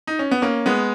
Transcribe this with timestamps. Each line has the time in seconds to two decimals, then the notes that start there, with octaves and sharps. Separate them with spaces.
0.07 D#4
0.19 C#4
0.31 B3
0.42 A#3 C#4
0.66 G#3 B3